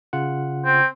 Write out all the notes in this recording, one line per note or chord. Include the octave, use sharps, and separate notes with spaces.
C#3 F4 F#5
C4